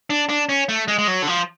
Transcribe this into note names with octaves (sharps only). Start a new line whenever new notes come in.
D4
D4
C#4
A3
G#3
G#3
F#3
D3
F3